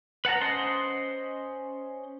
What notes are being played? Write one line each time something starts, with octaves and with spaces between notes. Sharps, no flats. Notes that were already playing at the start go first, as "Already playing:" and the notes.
B4 F#5 A5 A#5
C#4 C5 D#5 C6